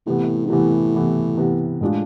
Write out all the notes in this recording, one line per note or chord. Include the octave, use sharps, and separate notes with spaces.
A2 C3 E3 B3
G#2
A2 C3 E3 B3
C3 E3 B3
C3 E3 B3
A2 G#3 D4 F4